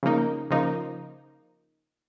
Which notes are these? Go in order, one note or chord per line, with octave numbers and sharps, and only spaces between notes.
C#3 F3 A#3 D#4
C#3 F3 A#3 D#4